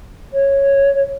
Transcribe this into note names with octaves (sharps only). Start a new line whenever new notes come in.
C#5